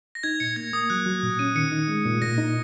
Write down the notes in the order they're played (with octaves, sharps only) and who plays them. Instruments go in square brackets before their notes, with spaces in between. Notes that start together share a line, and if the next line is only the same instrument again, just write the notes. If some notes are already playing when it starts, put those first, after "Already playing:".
[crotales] A#6
[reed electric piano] D#4 [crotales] G#6
[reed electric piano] A#2 [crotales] C#7
[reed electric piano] A#3 [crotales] G#6
[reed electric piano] A#3 [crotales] D#6
[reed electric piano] F#3 [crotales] F#6
[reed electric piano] F#3
A#2
[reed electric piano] C#4 [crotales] D#7
[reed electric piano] D#3 [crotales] C#7
[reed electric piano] D#4
G#3
A#2
[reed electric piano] A#2 [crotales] A#6
[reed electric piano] D#4